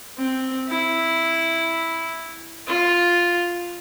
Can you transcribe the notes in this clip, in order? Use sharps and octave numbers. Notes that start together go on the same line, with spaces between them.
C4
E4
F4